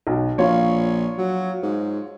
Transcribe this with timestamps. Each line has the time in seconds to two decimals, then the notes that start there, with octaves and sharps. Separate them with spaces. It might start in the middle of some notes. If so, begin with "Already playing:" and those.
0.07 B1
0.38 A#1 F4 C#5
1.18 F#3
1.63 G#2